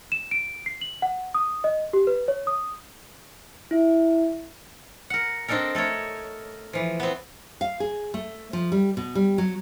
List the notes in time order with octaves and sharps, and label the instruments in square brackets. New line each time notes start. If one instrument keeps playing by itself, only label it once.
[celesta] E7
D7
C7
F#7
F#5
D#6
D#5
G4
B4
C#5
D#6
[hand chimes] E4 E5
[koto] A#4 F#5
C4 D4 D#4 A4 A#4
A3 A4 A#4 C#5
E3 F3
B3 C4
[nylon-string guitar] F5
G#4
A3
F3
G3
B2
G3
F#3